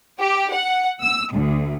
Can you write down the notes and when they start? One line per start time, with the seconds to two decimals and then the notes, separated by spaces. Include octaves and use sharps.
0.19 G4
0.53 F#5
1.02 E6
1.32 D2